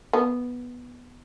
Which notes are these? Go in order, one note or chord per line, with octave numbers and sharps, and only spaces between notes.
B3